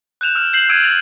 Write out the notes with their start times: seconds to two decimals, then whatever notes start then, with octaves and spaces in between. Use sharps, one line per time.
0.21 F#6 G6 E7 F7
0.35 E6 F6 E7 F7
0.53 G6 C7 F#7
0.69 E6 G6 G#6 D7 D#7
0.84 A6 F7